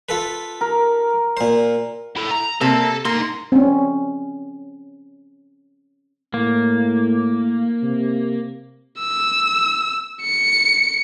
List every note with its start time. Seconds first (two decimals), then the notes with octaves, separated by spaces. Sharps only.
0.09 F4 A4 B4
0.61 A#4
1.37 A#2 C5
2.16 E4 A4
2.31 A#5
2.61 C3 A#3 A4 A5
3.05 A#3 D#4 C6
3.52 C4 C#4
6.34 A2 A#3
7.83 C3
9.00 E6
10.22 C#7